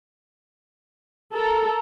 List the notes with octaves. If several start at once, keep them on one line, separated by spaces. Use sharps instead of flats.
A4 A#4 A#5